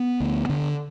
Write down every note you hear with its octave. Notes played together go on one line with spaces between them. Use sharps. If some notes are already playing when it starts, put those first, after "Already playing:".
Already playing: B3
D2
D3